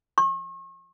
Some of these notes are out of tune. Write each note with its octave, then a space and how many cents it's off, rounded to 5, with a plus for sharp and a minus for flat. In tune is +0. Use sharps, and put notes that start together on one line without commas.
C#6 -40